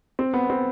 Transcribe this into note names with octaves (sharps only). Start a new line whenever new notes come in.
C4
B3
C4